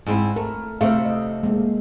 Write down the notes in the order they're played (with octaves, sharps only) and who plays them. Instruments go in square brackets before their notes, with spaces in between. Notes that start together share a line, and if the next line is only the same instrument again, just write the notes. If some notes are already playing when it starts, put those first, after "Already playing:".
[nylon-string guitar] G#2 C4 E4
[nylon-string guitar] A3 [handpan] A#4
[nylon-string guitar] C3 A3 [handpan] C5 E5 F5
[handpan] D#5
G#3 A#3